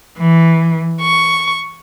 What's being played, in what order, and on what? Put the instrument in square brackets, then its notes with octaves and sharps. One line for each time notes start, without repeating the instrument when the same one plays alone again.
[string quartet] E3
C#6